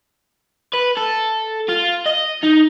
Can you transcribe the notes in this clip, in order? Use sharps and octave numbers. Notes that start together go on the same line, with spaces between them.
B4
A4
F4
D#5
D#4